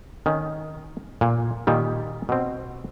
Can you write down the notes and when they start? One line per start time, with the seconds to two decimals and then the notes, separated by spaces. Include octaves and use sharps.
0.26 D#3 C#4
1.21 A#2
1.67 A#2 D#3 G3
2.29 B2 C4